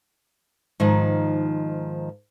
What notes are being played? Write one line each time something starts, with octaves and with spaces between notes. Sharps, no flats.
G#2 D#3 F3